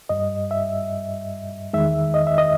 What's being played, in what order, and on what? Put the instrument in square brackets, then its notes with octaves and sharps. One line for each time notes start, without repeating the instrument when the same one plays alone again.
[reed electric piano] G2 G3 D#5
E5
E2 D#3 G#3 E5
D#5
E5
D#5